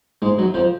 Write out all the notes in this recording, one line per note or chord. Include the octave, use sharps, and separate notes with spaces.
G#2 G#3
F#2 F#3
F2 F3